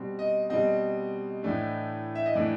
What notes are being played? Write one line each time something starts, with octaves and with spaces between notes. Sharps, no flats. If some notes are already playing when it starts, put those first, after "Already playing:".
Already playing: B2 G3 C4
D#5
B2 G3 C4 D#5
A2 E3 A3 D4
E5
D#5
A2 E3 A3 D4 D5